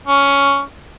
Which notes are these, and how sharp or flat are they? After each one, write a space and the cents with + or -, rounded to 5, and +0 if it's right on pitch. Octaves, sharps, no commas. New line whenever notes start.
C#4 +10